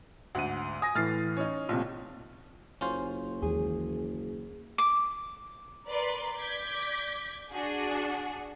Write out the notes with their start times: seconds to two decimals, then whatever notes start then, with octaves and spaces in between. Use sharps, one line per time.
0.35 D2 G#2 F#5 D#7
0.82 G#5 D#6 A#6
0.95 A2 E3 F6 A6 C7
1.36 C#4 D#4
1.69 A#1 C3 A3 F4
2.81 F#1 C#4 F4 C5
3.42 D#2 E3 G#3 G#4
4.78 D6
5.87 A#4 B4 D5 C6
6.36 D5 D6 G6 G#6 B6
7.51 D4 F#4 G#4